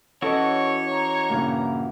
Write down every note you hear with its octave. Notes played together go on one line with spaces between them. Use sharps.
E3 C#4 E4 F#4 A4 C#5 D#5
A#5
G2 A#2 C#3